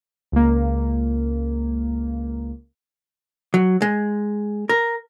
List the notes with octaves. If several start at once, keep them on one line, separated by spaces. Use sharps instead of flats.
C#2 A#3
F#3
G#3
A#4